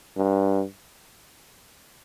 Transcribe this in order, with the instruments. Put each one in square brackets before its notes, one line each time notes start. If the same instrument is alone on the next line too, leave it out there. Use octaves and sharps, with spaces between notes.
[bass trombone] G2